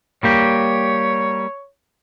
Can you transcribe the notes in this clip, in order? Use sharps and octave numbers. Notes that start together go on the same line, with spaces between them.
G3 A#3 G4 C#5